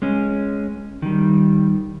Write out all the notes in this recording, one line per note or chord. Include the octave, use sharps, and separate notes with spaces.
G#3 C#4
D#3 G3